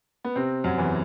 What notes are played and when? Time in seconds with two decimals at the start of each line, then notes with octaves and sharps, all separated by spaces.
0.24 B3
0.36 C3 C4
0.64 F#2 F#3
0.78 E2 E3